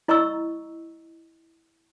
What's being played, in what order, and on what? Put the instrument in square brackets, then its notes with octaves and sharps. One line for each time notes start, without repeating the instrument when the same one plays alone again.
[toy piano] E4 D#5 A#5 C#6 E6